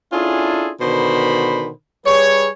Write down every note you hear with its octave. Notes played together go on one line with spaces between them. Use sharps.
C#4 D4 E4 F4 G#4 A4
B2 D3 D#3 C5 B5
G3 G#4 B4 C#5